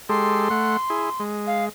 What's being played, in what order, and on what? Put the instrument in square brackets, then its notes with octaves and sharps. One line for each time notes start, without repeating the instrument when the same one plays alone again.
[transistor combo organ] G#3 G4 A4 [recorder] C6
[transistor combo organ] A3 F#5
E4 G#4
G#3
[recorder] F5